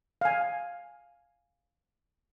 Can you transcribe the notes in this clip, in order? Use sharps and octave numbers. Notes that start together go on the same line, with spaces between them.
F5 G#5